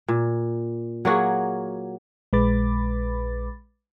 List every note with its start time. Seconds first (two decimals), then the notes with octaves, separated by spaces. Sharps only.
0.08 A#2
1.05 F#3 A#3 F#4 G#4
2.33 A#1 G#3 B4 B5 D6 A6